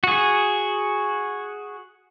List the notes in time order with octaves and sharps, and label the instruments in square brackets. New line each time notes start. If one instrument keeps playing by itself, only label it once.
[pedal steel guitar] F#4 G#4